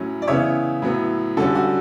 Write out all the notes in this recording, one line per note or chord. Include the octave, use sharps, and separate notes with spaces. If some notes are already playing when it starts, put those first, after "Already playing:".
Already playing: A2 F#3 C#4
D5
C#3 E3 B3 C#5 E5
A2 F#3 B3
D3 G3 C#4 F#4 A4
F#4